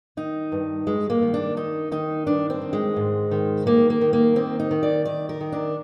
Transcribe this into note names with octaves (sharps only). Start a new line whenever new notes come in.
D#3 D#4
G2
G2 G#3
A#3
D#3
D4
D#3 D#4
D#3 D#4
G2 D4
C4
D#3
G#3
G#2
D#3
D#3 A#3
A#3
D#3
A#3
D#3 C4
D#4
D#3
D5
D#3 D5
A#4
D#3
D4